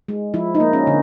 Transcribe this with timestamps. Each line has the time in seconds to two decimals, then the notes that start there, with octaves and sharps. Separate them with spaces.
0.08 G#3
0.34 F3 E4
0.55 D#4
0.60 A#3
0.73 C#4
0.87 D3